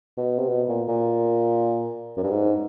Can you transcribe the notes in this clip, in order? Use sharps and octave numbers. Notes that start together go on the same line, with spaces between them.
B2
C3
B2
A#2
A#2
F#2
G2
G#2